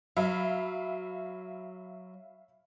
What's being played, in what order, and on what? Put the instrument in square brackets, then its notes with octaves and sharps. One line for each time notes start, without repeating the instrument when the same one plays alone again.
[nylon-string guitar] F#3 [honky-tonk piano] E5 F5 B5